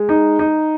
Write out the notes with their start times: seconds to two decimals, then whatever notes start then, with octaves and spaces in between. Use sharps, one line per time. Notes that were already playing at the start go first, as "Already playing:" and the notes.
Already playing: G#3
0.09 D#4
0.39 D#4